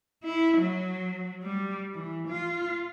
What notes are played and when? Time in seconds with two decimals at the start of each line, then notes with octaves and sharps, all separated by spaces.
0.24 E4
0.57 F#3
1.43 G3
1.94 E3
2.28 F4